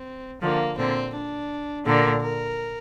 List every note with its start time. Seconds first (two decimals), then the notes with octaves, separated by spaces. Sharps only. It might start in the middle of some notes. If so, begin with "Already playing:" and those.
Already playing: C4
0.41 D3 F3 A#3
0.78 A#2 D3 C4
1.14 D4
1.86 A#2 D3 A#4
2.23 A#4